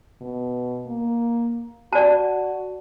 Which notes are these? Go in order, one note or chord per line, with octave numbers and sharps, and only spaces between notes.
B2
A#3
F#4 D5 A5